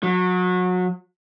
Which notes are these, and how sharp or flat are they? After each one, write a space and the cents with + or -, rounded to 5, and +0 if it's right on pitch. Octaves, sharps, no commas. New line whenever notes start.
F#3 -30